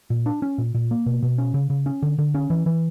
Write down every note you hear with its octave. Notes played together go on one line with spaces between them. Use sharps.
A#2
D4
C#4
A#2
A#2
A#3
B2
B2
C#4
C#3
C#3
C#4
D3
D3
C#4
E3
E3